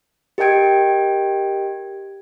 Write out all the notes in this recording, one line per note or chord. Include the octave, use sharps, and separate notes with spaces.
G4 A#4 D#5 G5 G#6 D7